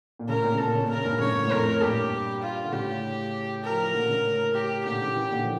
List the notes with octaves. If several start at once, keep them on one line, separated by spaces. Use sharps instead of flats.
A#2
A2 C#3 A#4
A#2
C#3 A4
A#2
C#3
A#2
A#4
C#3
G2 A#2
A2 C#3 C#5
A2 C#3
A#2
F2 A2 A#4
G2 A#2 G4
F4
D3
A2 C#3 G4
A#4
F3
E3
A#2 D3
A2 C#3
G4
A#2 D3 G4
C#3 E3
C#3 E3
A#2 D3
F3